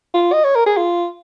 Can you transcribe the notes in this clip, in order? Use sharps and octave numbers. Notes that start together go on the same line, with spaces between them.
F4
D#5
C#5
A#4
G#4
F4